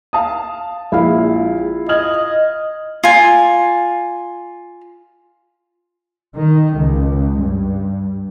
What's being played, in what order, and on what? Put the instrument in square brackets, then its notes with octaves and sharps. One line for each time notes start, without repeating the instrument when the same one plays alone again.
[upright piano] F5 A5 D#6
[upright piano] A#1 G#3 [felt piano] E4 F4 F5
[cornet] D#5 [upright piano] F6 G#6 F#7
[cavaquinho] F4 G#5
[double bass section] D#3
C#2
G2